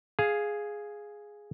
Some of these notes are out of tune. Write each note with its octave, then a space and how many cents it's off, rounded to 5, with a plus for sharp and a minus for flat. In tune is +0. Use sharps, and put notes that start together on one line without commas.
G#4 +0 F5 +0